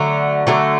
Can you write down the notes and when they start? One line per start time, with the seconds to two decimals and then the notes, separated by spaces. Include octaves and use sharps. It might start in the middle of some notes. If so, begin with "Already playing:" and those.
Already playing: D3 F#3 A3
0.47 D3 F#3 A3